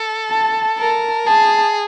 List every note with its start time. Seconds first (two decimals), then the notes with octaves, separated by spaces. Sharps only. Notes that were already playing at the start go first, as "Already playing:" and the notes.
Already playing: A4
0.30 A5
0.78 A#4 A5
1.27 G#4 A5